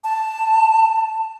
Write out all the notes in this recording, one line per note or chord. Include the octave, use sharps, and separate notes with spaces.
A5